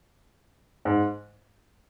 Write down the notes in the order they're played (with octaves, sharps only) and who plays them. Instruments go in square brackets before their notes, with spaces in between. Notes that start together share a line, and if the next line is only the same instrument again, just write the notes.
[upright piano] G#2